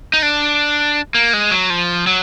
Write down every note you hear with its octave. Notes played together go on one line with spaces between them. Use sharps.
D#4
D4
A#3
G#3
F#3
F3
F#3